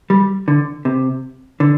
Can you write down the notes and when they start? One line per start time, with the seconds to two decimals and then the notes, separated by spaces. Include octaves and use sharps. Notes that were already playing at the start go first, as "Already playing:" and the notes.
0.10 G3
0.48 D3
0.85 C3
1.60 D3